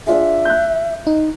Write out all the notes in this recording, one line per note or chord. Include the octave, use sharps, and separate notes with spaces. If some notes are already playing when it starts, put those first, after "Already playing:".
D4 F4 G#4 E5
F#6 G6
D#4